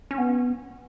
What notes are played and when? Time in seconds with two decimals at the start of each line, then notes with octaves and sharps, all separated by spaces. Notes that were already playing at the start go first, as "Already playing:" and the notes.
0.11 C#4
0.18 B3